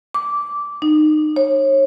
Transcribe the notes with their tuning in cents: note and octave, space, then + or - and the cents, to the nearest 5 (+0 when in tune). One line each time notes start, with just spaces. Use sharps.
D6 -10
D#4 -30
C#5 -30